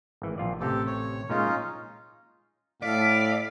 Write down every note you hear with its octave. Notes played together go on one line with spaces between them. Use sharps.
G#1 E3
A#1 F4 D5
A1 C3 G4 A4
C#5
A#2 G#3 C#4 D#4 F4
A2 A4 D5 F5 B6